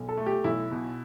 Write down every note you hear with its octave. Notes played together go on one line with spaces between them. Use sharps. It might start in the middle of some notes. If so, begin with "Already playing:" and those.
Already playing: B1
A4
A3
G4
B1 E4
B2